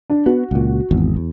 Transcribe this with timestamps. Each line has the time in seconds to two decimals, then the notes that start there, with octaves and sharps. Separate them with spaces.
0.10 D4
0.26 B3 F#4
0.51 C#2 A#2
0.91 G#1 E2
1.16 E2